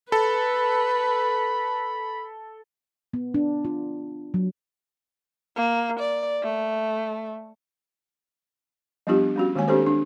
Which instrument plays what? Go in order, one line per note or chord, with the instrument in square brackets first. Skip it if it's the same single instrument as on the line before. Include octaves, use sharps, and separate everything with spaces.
[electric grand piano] A4 [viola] B4 [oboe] B5
[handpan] B3
D4
F4
F#3
[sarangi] A#3
D5
A3
[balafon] F3 G3 B3 D4 F4 G4
G3 C#4 F#4
D#3 G#3 A#3 C#5 G#5
C4 D4 G4 A4 C5
D4